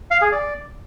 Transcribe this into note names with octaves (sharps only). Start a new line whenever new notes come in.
F5
G#4
D5